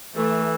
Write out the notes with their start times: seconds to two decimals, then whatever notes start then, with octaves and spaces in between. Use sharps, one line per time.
0.15 E3 A3